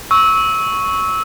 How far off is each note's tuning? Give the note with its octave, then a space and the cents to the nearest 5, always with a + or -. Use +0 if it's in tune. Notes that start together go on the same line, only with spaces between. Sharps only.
C#6 +0 E6 -20